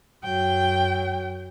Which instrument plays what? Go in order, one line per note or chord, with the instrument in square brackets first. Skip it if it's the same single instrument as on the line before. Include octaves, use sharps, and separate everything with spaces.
[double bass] F#2 F#3 [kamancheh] G5